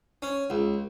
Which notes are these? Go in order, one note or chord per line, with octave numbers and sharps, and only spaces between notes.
C#4
C#2